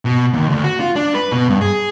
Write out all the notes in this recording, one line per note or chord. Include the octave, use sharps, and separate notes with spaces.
B2
D#2
D2
F#4
F4
D4
B4
B2
G2
G#4